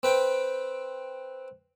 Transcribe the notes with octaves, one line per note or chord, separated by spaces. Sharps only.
C4 B4 G5